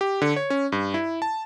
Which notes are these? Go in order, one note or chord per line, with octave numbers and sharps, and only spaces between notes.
G4
D3
C#5
C#4
G2
E4
A5